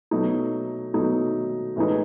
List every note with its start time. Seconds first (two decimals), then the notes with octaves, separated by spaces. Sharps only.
0.11 B2 F#3 A3 D#4
0.93 B2 F#3 A3 D#4
1.76 A2 E3 G#3 D#4